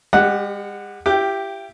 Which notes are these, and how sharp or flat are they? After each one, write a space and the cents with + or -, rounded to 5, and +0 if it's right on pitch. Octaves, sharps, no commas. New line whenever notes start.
G#3 -45 G4 +0 F#5 +0
E4 +40 G4 +0 G5 -15